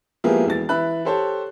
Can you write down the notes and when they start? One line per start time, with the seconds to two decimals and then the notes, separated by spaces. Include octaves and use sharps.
0.24 F3 G#3 A#3 B3 E4 G4
0.46 E1 E3 A6
0.69 E3 E4 E5 B5 F#6
1.05 G4 A4 C5 C#5 A5